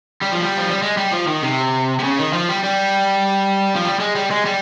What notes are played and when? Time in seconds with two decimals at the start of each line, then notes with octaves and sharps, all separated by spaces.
0.21 G3
0.32 F3
0.42 G3
0.57 F3
0.70 G3
0.82 G#3
0.97 G3
1.12 F3
1.28 D#3
1.43 C3
1.99 C3
2.03 C#3
2.19 D#3
2.33 F3
2.49 G3
2.64 G3
3.76 F3
3.85 G3
4.00 G#3
4.15 G3
4.30 G#3
4.45 G3